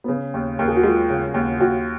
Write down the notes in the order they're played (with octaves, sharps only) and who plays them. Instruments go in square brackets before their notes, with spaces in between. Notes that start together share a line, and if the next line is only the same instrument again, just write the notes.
[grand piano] B3
[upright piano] C#3 [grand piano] C#4
[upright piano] D#2
[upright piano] D#2 [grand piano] A#4
[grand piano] G#4
F#4
[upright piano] G#3 [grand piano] F4
[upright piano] C#3
D#2
[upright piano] D#2 [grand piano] F#4